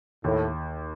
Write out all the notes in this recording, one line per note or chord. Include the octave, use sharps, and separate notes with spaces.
D#2 A2